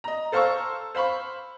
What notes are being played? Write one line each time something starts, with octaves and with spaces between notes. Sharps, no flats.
D#5 A#5
A4 C5 F5 A#5 C#6 E6
C5 F5 B5 C#6